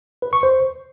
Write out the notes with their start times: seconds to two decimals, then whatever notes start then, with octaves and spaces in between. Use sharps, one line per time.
0.22 B4
0.33 C#6
0.43 C5